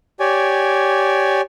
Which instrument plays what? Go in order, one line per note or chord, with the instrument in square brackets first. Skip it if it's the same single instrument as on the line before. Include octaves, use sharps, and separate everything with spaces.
[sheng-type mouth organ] G4 C#5 D5 G#5